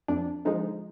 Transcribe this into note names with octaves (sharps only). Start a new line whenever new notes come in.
F2 D4
D3 F3 G#3 D#4